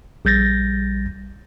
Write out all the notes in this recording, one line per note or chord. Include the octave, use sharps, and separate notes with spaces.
A#1 G3 G6 A6 A#6